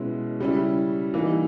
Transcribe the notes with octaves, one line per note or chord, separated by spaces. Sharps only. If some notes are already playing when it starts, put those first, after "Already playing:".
Already playing: B2 G#3 C#4 E4
C#3 G3 C#4 E4
E3 G3 A#3 D#4